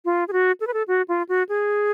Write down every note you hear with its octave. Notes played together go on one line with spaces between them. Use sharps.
F4
G#4
F#4
A4
B4
A4
F#4
F4
F#4
G#4